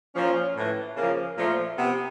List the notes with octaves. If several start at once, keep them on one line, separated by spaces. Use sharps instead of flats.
A#2 F3 C#4
A2 E3
C#3 F3 A#3
A#2 F3 A3
C3 B3